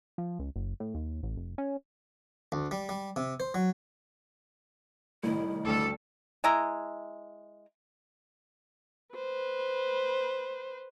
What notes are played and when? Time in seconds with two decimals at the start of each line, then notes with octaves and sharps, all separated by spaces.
0.18 F3
0.39 C#2
0.56 F#1
0.80 A2
0.95 D#2
1.23 A1
1.37 F1
1.58 C#4
2.52 D2
2.71 G3
2.89 G3
3.16 C3
3.40 C5
3.54 F#3
5.23 C2 A2 D#3 E4
5.65 D2 G3 A4
6.44 G#3 E4 A#5
9.15 B4 C5